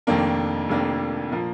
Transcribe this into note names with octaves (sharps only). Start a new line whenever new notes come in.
F1 F2 D#3 A#3 D4
F1 F2 D#3 A#3 D4
A#2 F3 A#3